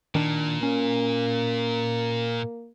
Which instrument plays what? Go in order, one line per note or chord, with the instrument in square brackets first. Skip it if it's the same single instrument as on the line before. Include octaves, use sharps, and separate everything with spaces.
[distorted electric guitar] A#2 [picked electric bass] D#3 D4
[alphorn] A#3 [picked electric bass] C#4